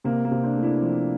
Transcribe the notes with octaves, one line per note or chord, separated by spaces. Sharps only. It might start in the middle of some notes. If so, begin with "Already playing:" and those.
C3 A#3
A#3
C3
C4 D4
A3
D4 E4
F3